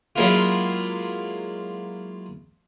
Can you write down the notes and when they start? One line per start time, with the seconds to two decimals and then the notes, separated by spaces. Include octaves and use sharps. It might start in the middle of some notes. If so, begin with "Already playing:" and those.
0.16 F#3 G#3 A#3 C#4 E4 F4